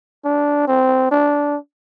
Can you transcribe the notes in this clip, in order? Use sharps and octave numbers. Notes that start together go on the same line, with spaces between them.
D4
C4
D4